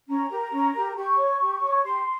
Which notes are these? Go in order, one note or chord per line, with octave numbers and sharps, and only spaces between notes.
C#4 A#5
G4 A#4
C#4
G4 A#4
G4 C#6
C#5
G4
C#5
G4 C6